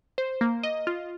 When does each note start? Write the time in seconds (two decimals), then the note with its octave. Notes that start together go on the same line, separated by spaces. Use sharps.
0.18 C5
0.41 A#3
0.63 D#5
0.87 F4